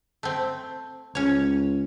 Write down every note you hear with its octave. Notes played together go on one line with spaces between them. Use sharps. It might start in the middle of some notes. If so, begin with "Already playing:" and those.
A3 C4
C#2 C#4 C#5